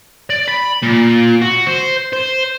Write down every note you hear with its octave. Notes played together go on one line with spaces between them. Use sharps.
D5
B5
A#2
F#4
C5
C5